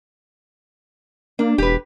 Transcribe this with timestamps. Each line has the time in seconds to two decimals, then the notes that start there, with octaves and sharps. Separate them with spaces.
1.39 A#3 D4
1.58 E1 G4 B4